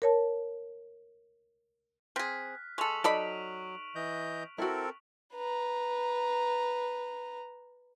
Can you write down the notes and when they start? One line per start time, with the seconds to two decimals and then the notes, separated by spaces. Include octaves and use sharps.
0.02 A#4 C#5 A5
2.16 C4 G#4 F6 F#6 B6
2.78 G#3 A4 C#6 F7 F#7
3.04 F#3 D#4 A4 D5 B5 D7
3.95 E3 D#5 G6
4.58 C4 E4 F#4 A4 A#4
5.35 B4 A#5